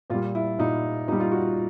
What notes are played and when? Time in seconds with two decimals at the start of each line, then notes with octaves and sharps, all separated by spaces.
0.10 A#2 F4
0.14 G3
0.35 E4
0.58 A#2 G3 D#4
1.08 A#2 D#4
1.12 G3
1.20 F4
1.31 F#4